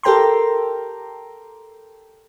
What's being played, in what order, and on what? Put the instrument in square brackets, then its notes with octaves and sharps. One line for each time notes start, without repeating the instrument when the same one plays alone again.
[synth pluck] G4 A4 A#4 G5 A#5 C6